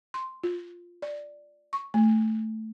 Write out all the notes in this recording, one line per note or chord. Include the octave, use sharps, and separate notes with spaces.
C6
F4
D5
C#6
A3